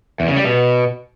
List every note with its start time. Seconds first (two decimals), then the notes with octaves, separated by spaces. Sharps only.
0.20 E2
0.28 C#3
0.36 G3
0.45 B2